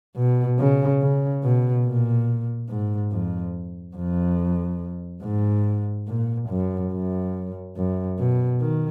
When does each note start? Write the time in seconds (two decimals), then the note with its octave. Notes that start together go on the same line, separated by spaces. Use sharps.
0.17 B2
0.59 C#3
1.01 C#3
1.44 B2
1.86 A#2
2.69 G#2
3.12 F2
3.96 F2
5.23 G#2
6.08 A#2
6.49 F#2
6.92 F#2
7.76 F#2
8.18 B2
8.61 D#3